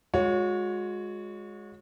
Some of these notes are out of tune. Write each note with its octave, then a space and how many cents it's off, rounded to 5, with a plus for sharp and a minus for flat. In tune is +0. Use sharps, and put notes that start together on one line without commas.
G#3 +0 F#4 -40 C#5 +5